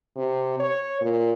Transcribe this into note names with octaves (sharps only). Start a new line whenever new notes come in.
C3
C#5
A#2